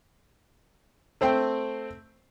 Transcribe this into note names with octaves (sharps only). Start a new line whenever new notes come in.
A3 C4 C5 G5